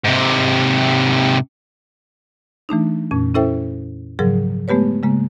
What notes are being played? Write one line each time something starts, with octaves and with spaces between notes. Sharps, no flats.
G#2 C3
E3 A3 D4 D#4
F2 A#2 C#4
C#4 E4 A4 C5 E5 G5
G#2 C#3 F3 F#3 G#4 A#4
G#3 A3 B3 G4 B4 C#5
C#3 G#3 A#3